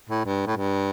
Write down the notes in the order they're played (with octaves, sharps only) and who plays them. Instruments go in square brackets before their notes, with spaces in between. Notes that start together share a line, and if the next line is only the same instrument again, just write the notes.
[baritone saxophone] A2
G2
A2
G2